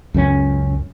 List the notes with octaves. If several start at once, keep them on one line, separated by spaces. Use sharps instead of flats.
C#2 F#2 A3 C#4